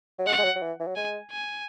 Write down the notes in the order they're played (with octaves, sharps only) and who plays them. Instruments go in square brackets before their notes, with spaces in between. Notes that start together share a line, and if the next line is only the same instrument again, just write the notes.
[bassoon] F#3
[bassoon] G#3 [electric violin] F#5
[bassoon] G#3
F#3
F#3
E3
E3
F#3
[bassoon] G#3 [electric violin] G#5
[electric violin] G#5